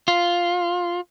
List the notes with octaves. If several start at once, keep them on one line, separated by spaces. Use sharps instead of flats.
F4